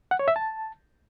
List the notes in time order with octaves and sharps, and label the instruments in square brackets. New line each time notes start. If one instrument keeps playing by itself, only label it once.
[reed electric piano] F#5
C#5
E5
A5